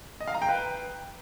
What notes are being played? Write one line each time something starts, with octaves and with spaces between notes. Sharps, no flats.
D#5
F5
A#5
G5
B4